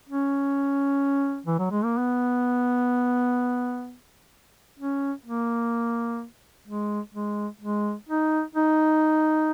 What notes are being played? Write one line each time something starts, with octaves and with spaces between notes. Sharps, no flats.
C#4
E3
F#3
G#3
A#3
B3
C#4
A#3
G#3
G#3
G#3
D#4
D#4